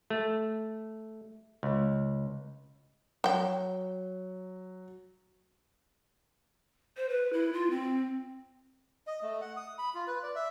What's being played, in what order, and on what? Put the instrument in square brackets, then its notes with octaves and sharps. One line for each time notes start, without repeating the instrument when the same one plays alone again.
[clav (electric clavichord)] A3
C#2
[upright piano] F#3 [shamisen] F#4 G5
[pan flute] C5
B4
E4
F4
C4
[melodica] D#5
A3
F#5
D#6
B5
F4
B4
D5
E5